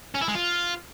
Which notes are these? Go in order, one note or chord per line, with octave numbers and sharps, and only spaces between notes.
C#4
E4
G#3
F4